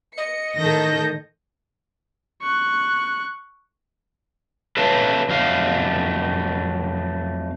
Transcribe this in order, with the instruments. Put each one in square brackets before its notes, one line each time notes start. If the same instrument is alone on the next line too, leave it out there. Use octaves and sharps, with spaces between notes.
[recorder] D#5 [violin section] C#7
[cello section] A2 D#3 [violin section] A4 G6 A#6
[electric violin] C#6 F#6
[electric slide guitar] A4 B4 C#5 E5 F5 A5
F2 F#3 A3 F5